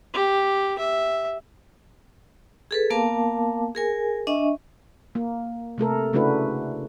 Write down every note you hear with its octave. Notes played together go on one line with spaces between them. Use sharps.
G4
E5
G#4 A4 B4
A#3 B3 A#4 F5 A5 D6
G#4 A#4 G#5
D4 D#5 E5 G#5 C#6
A#3
C3 A3 A4 A#4
C#3 A3 D4 E4 F#4 B4